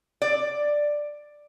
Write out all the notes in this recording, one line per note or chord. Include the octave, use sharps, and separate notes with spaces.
D5